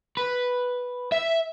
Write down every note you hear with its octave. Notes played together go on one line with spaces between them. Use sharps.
B4
E5